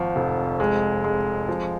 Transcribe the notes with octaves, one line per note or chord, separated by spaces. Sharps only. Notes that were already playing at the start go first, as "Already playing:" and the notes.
Already playing: G#1 F3
F1
G#3
G#3
F3